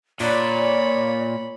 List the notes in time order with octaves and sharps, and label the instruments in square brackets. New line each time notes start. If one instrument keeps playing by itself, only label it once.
[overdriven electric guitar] A#2 [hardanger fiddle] C#5 B5 [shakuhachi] D5